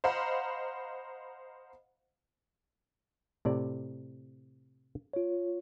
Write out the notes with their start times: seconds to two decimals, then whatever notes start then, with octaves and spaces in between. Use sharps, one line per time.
0.04 C5 D#5 F5 F#5 A#5 B5
3.45 A2 C3 D5
5.13 F4 C#5